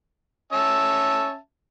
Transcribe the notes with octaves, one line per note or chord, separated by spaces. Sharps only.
C#4 E5 A5